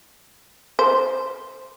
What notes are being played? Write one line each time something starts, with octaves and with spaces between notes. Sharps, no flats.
C5